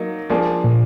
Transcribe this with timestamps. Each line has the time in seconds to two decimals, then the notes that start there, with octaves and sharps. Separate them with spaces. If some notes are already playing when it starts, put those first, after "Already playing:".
Already playing: F#3 A#3 D#4
0.30 F3 A#3 D4 G#4
0.64 A#2